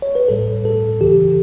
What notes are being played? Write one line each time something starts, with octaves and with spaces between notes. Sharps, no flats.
C#5
B4
A1 A2 G3 A4
A4
C#2 C#3 E3 G4